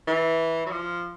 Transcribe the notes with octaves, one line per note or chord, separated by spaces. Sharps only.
E3
F#3
F3